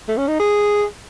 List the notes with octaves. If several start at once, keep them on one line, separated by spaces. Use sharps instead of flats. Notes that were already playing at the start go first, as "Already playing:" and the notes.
A3
C#4
D#4
G#4